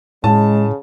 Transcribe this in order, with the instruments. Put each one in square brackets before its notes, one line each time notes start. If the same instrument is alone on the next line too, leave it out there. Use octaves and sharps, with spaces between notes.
[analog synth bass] A2 [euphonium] C#3 [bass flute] G#3 [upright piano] A5